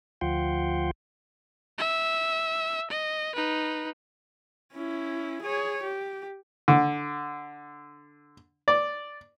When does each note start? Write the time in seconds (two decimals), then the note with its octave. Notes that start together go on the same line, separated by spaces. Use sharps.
0.21 D2 F3 F4 F#5 G5 C6
1.79 E5
2.90 D#5
3.35 D#4 B4
4.72 C#4 E4
5.42 G#4 C#5
5.83 G4
6.68 D3
8.68 D5